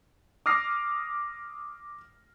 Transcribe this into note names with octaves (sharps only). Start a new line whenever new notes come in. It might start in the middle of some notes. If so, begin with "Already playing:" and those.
D6 D#6 F6 A#6 C7